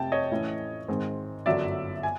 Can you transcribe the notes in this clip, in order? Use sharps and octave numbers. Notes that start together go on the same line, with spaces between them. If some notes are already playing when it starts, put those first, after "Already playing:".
Already playing: F1 F2 C3 G5 A5
C#5 D#5
A2 E3 A3 C#4 E4
G#2 D#3 G#3 C4
G1 F#2 D3 F#3 D5 E5
G#5